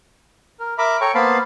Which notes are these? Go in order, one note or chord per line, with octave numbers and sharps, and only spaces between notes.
A#4
A#4 E5 A#5 B5 D6
A4 C#5 G5 A#5 C#6
A#3 B3 C5 F5 A5 B5